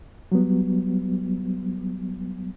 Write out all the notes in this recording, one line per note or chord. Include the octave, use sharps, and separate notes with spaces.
F#3 G3 B3